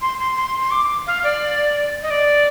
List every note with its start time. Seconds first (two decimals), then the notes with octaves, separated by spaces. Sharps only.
0.01 C6
0.19 C6
0.37 C6
0.60 C6
0.71 D6
1.07 F5
1.24 D5
2.02 D#5
2.10 D5